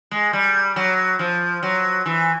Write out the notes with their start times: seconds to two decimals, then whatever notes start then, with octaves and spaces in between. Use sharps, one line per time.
0.11 G#3
0.33 G3
0.76 F#3
1.19 F3
1.63 F#3
2.06 E3